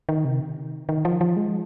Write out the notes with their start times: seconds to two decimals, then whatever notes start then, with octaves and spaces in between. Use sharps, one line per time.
0.09 D#3
0.25 C3
0.41 D#3
0.89 D#3
1.05 F3
1.21 F3
1.37 G#3